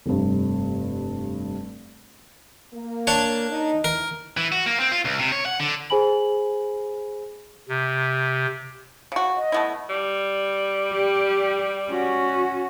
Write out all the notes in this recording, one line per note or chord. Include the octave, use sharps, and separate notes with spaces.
F1 G2
A#3
D4 C#5
D#4
E3 A#4
E3
F#4
A#3
C4
F4
C#2
C3
C#5
F#5
D3
G#4 C5 G#5 B5 F#7
C3
C#3 F#4
D#5
A3 B3 E4
G3
G4
C#4 F#4